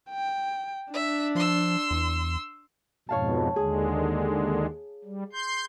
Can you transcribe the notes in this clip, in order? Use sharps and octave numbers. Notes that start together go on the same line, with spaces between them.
G5
D4 E5
F3 C6 E6
E2
F2 G#2 B2 C#5 F5 A5
D#2 D3 G#3 G#4
G3
C6 G6